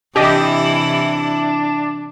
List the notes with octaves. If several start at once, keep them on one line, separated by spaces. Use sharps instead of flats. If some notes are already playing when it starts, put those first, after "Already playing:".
C3 E3 D4 E4 G4 D#5